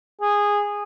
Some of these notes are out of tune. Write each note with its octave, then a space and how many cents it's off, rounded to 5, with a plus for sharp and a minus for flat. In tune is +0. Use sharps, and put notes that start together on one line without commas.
G#4 -15